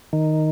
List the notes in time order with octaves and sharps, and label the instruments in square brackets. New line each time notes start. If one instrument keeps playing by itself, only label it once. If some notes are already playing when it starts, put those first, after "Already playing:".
[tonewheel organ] D#3